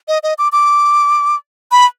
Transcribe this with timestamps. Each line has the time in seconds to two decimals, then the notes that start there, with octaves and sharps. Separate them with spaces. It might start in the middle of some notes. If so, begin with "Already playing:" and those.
0.08 D#5
0.23 D#5
0.38 D6
0.52 D6
1.72 B5